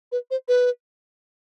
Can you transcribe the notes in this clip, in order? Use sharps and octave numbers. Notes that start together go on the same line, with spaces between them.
B4
C5
B4